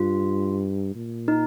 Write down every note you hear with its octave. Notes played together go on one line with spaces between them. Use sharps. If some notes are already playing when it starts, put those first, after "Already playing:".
Already playing: G2 F4
A#2
D#4